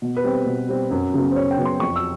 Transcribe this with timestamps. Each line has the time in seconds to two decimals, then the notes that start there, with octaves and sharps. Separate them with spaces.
0.02 B2
0.17 B4
0.24 G3 C4
0.46 B2
0.69 G3 C4
0.91 F#2
1.14 C#3 F#3 B3
1.31 C5
1.36 F#2 C#5
1.51 G5
1.58 C#3 F#3 B3
1.65 C6
1.80 F2 C#6
1.96 E6